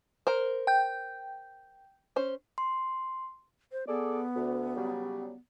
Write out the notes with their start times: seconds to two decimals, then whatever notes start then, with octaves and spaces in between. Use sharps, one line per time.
0.27 A#4 C5
0.67 G5 G6
2.16 C#4 C5
2.58 C6
3.72 C5
3.88 B3 G#4 A4 D5
4.35 D2
4.76 C#3 F#3 G3